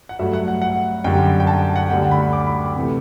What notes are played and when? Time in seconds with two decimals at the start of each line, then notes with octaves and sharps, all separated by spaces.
0.09 F#5
0.19 G2 F#3 A3 E5
0.33 F#5
0.48 F#5
0.62 F#5
1.04 F#2 D3 G3 G5
1.40 G5
1.47 A5
1.62 G5
1.76 F#5
1.90 D2 D3 G3 G5
2.11 B5
2.33 D6
2.47 B5
2.76 C3 E3 A3